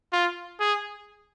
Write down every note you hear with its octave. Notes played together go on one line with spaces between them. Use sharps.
F4
G#4